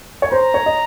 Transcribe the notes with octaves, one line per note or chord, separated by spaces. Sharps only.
C#5
C5 A#5
C#5
D#5